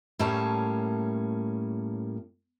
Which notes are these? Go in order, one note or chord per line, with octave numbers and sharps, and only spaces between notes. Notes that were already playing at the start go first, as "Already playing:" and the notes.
A2 G3 A#3 C#4 A5